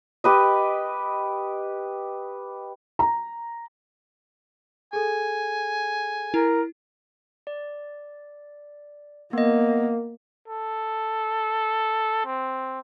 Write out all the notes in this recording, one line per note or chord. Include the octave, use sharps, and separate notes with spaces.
G4 B4 D#5
A#5
G#4 A4 G#5
E4 A#4
D5
A#3 B3 D#5
A4
C4